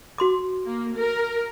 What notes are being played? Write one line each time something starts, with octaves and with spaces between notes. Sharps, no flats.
F#4 C6 D6
A#3
A#4